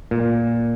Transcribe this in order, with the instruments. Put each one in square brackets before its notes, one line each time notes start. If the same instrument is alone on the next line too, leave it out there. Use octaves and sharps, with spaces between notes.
[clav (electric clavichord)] A#2